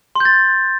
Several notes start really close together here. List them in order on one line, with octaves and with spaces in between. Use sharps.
C6 G6 A6